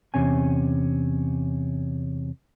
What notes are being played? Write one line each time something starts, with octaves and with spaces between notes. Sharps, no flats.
E2 C3 C#4 G#5